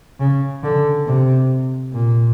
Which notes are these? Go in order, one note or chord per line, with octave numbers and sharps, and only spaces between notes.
C#3
D3
C3
A#2